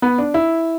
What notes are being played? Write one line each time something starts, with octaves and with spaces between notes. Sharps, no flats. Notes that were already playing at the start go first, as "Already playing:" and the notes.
B3
D4
E4